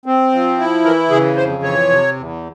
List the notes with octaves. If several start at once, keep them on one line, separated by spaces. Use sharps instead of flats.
C4
F3
E4
E3 A#4
C#3 G#4
F2 C5
E3 C#5
C3
E2